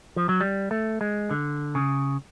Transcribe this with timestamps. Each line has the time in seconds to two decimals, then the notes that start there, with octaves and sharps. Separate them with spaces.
0.16 F3
0.29 F#3
0.41 G3
0.71 A3
1.01 G#3
1.31 D3
1.75 C#3